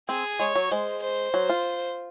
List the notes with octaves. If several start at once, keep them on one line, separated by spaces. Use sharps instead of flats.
C4 G#4
G#3 C#5
F#3
G#3 C5
C5
F#3
F4